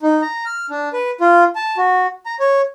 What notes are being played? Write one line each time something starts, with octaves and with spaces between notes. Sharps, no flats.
D#4
A#5
F6
D4
B4
F4
A5
F#4
A#5
C#5